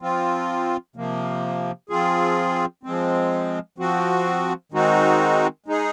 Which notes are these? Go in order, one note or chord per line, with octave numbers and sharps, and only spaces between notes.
F3 C4 F4
C3 F3 A#3
F3 C4 F4 G#4
F3 G#3 C4
F3 C4 F#4
D#3 G#3 C4 D#4 F#4
G#3 D#4 G#4